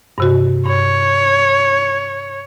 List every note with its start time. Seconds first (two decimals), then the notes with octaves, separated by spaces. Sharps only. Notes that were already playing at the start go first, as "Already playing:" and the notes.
0.18 G2 C3 F#4
0.66 G2 C#5